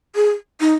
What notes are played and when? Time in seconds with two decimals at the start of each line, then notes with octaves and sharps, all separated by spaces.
0.15 G#4
0.60 D#4